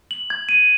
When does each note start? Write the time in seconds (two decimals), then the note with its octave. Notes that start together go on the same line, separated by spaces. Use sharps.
0.11 F#7
0.30 G#6
0.49 D#7